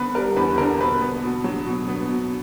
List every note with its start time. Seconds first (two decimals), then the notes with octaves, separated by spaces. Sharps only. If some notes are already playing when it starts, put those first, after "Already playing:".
Already playing: D3 B3 B4
0.15 G3 A#4
0.36 E2 B4
0.58 D3 A#4
0.80 B2 B4
1.01 B3
1.23 B2
1.44 F#3
1.67 B2
1.88 B3
2.10 B2